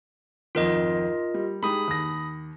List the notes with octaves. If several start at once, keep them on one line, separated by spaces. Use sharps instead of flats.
G#1 F2 F4 A#4 D#5
G3
G#3 D#4 G4 B5 D#6
D#2 A#6